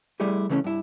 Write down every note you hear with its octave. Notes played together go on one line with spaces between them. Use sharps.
G3 A3 E4 G4 G#4
C#3 E3 A3 C4 C#4
G2 E4